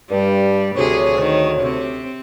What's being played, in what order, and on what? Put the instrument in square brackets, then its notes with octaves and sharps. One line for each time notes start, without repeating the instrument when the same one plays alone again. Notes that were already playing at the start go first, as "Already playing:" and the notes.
[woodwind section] G2 [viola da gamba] G3
[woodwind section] D2 C#5 [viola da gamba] C3 G#4
[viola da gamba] D#3
C3 C4